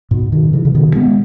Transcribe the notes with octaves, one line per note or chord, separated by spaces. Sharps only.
G#2 B2
B2 D#3
C#3 E3
C#3
B2 D#3
G#3 B3